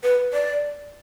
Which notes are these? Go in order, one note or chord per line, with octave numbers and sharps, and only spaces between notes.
B4
D5